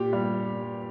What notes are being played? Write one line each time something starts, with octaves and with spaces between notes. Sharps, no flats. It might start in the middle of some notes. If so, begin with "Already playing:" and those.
Already playing: A#2 G4
G3